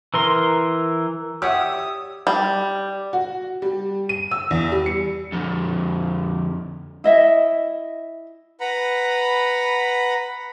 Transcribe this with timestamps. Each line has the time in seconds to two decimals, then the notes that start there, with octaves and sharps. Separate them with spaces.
0.14 E3 A#4 C6
1.42 G4 C#5 D5 E5 F#5 G5 D#6 E6
2.27 G3
3.13 F#4
3.62 G3
4.09 D#7
4.31 E6
4.51 E2
4.72 G3
4.86 C#7
5.32 F2 D3
7.04 E4 D#5 E5
8.60 B4 F#5 A#5 B5